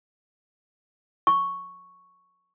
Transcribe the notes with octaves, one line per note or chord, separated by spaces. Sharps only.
C#6